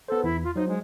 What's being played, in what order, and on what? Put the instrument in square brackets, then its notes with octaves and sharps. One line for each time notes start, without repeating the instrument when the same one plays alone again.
[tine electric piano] B3 C5 [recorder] A4
[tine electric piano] E2 [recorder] E4
[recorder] F4
[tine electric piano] F#3 C5 [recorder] D#4
[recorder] G#3